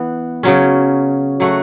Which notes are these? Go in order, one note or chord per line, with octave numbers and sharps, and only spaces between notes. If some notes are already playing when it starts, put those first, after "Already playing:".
Already playing: E3 B3
C#3 F#3 C#4
F#3 A3 F#4